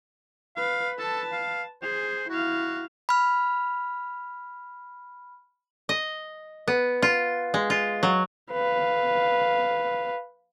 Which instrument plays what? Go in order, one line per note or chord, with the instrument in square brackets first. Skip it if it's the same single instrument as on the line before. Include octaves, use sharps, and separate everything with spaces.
[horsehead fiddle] B4 [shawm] F5
[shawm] A4 [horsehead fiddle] B4 A5
[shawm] F5
[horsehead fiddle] G#4 [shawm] C5
[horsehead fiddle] E4 F5 [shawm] F#4
[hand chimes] B5 F6
[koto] D#5
B3
F4
G#3
F4
F#3
[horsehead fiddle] B4 F5